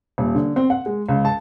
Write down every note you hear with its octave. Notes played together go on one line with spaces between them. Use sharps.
D#1
D3
C4
F#5
G#3
C#2
A5